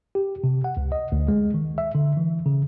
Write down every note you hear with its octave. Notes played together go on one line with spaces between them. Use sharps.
G4
C3
F#5
C#2
D#5
D2
G#3
D#3
E5
D3
E3
C#3